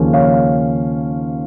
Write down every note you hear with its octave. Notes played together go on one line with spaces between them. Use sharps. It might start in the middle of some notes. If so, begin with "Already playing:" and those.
Already playing: D#2 C#3 F3 A#3 C#4
C#5 F5